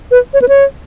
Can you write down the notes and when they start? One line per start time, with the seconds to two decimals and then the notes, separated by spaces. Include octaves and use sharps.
0.11 B4
0.34 C#5
0.42 B4
0.49 C#5